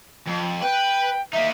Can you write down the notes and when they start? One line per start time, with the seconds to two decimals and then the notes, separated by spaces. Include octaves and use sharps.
0.27 F2
0.62 B4 G5
1.33 A#3 D#4 E5